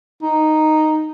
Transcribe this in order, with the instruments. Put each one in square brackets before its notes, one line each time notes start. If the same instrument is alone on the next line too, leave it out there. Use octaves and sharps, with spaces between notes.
[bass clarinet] D#4